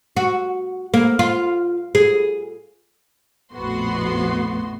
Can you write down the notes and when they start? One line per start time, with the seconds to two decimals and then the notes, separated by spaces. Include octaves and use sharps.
0.17 F#4
0.94 A#3
1.19 F4
1.95 G#4
3.53 A#1 F2 A2 B3 F#4 C6